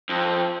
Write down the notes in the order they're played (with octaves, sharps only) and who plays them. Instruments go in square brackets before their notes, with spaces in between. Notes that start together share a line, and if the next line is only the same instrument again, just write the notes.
[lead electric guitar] F2